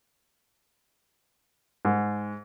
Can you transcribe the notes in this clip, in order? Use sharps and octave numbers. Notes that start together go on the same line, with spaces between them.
G#2